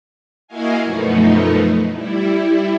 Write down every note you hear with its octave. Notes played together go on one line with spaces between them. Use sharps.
A#3 E4 F#4 D#5 F5 G#5
F#2 B2 F3 A3 B3 D#4
G3 E4